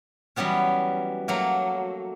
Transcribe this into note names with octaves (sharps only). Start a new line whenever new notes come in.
E3 F#3 G3 B3 C#4
F#3 A3 A#3